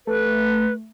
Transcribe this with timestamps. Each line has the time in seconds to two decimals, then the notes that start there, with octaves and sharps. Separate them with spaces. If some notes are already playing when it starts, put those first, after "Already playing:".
0.07 A3 B4